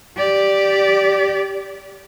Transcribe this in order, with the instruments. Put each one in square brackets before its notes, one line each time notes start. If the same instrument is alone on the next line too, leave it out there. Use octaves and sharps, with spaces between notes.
[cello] G4 D5